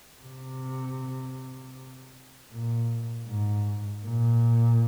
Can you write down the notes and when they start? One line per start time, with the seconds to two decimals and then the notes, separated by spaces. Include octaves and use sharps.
0.23 C3
2.52 A#2
3.27 G#2
4.05 A#2